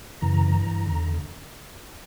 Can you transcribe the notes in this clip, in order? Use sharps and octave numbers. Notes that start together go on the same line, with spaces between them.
F#2 C#3 E3 A#5
G2 E3
E2 D3